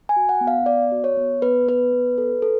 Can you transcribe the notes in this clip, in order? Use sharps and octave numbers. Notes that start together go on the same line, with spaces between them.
G#5
F#4
F#5
B3
F5
B3 D5
F#4
C#5
B3
B3 B4
B3 B4
B3
A4
A4